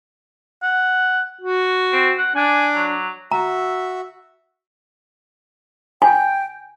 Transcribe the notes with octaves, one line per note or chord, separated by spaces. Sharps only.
F#5
F#4
C4
F#5
D4 G#5
F#3
F#4 E5 A#5
G5 G#5